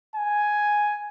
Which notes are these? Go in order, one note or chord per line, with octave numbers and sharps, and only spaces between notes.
G#5